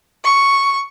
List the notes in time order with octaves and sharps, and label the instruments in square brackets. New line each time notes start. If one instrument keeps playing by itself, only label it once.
[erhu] C#6